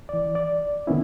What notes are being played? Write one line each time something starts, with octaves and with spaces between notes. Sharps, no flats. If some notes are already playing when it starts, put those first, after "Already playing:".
E3 D5
D5
D3 D#3 B3 C#4 E4